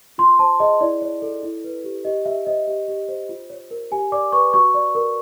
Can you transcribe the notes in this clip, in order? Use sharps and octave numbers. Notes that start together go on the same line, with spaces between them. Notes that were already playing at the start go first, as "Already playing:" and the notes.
F4 C6
C5 A5
G#4 D#5
E4 D5
C#5
A4
E4
B4
G4
G4 D#5
G4 E5
C5 D#5
G4
G4
C5
F4
C#5
A#4
G4 G#5
D5 D6
B4 C#6
F#4 C#6
D5
A#4